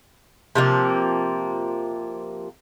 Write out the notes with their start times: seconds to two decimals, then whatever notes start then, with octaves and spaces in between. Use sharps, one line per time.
0.55 C3 F3 A#3